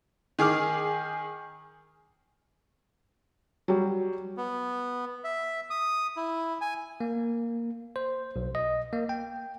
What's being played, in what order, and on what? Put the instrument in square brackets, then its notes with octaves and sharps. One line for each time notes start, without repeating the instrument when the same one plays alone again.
[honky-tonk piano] D#3 G#4 D6 F6
[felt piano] F#3 G3
[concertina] B3
E5
D#6
E4
G#5
[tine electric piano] A#3
C5
B1
D#5
A#3
G5